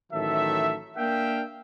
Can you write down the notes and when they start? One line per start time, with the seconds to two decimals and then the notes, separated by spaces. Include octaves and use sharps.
0.13 A1 D#3 F#3 A4 E5
0.97 A#3 D4 A#4 E5 F5 G5